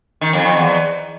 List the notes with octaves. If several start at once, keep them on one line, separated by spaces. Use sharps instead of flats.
D#3
F2
F2
E2